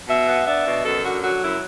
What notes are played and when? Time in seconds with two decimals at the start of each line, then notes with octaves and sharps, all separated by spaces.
0.08 B2 E5
0.28 B3
0.46 D4 E5
0.67 B2
0.85 F#2 A4
1.03 D3 F#4
1.23 F#3 F#4
1.42 F#2 E4